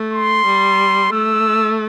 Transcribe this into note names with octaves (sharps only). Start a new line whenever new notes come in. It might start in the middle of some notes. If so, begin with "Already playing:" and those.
Already playing: A3
C6
G3
A3 E6